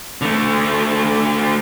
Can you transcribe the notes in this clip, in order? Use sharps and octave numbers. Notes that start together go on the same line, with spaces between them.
D3 A3